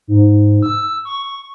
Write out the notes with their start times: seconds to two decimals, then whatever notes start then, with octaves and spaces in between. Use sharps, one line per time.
0.08 G#2
0.62 E6
1.05 C#6